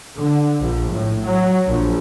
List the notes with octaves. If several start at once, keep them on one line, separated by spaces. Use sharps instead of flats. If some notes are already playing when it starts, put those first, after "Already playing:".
D3
A#1
A2
F#3
A#1